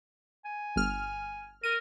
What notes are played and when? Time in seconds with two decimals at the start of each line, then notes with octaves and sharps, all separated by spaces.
0.45 G#5
0.76 G1 F6
1.64 A#4 D#7